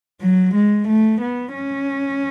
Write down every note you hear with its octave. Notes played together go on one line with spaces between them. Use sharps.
F#3
G#3
A3
B3
C#4